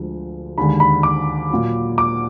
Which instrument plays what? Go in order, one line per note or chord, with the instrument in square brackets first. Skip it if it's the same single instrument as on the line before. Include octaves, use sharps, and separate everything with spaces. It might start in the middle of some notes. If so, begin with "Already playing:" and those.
Already playing: [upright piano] D2 D3 F3 G#3
D#2 D3 G#3 B5
B5
D6
A#2 F#3
D6